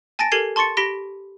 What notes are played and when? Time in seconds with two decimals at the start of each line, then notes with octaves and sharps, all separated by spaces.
0.19 G#5 A5 A6 A#6 D7
0.32 G4 A4 A#4 G#6 C7 D#7
0.56 A5 C6 C#6 A6 C#7
0.77 G4 B5 A#6 B6 D7 G7